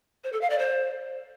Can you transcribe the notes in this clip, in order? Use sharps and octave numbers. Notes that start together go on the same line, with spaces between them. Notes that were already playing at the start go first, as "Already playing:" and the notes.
C5
A4
F5
D5
C5